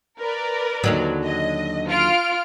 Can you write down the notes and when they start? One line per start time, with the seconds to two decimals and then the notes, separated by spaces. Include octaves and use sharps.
0.19 A#4 B4 D5
0.84 D#2 D3 F#3
1.25 D#5
1.89 F4 F6 D7